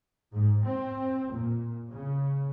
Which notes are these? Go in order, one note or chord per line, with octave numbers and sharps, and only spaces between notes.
G#2
C4
A#2
C#3